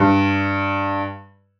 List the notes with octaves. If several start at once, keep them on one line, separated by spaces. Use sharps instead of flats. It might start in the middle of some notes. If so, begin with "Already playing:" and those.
Already playing: G2